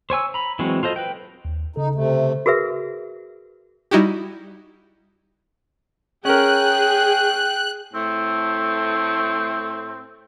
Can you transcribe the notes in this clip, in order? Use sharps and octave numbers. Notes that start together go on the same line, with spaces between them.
C5 C#5 G#5 E6
A#5 B5
E3 F#3 G#3 C4 F#4
F4 A4 C5 D#5
B4 G5
D#2
C#3 D#4 A4
C3 A3
F#4 G#4 A#4 B4 E5
G3 D#4 E4 F#4 G4
C#4 G#4 A#4 G5 F#6
A2 A3 C4